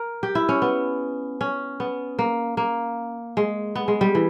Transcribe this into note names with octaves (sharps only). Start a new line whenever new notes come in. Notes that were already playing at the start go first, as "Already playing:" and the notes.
Already playing: A#4
G4
E4
C#4
B3
C#4
B3
A#3
A#3
G#3
B3
G#3
G3
E3